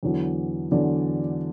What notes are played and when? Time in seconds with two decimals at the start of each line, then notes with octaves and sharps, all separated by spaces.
0.03 E2 D3 F#3
0.71 E2 D3 F#3 D5